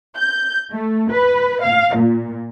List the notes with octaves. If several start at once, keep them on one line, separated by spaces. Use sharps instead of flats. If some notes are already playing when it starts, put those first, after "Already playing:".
G6
A3
B4
F5
A#2